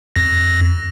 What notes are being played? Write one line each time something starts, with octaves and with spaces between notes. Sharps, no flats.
F2 A#6